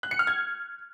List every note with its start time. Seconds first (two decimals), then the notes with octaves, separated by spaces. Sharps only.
0.03 F#6
0.11 C#7
0.19 F6
0.27 G#6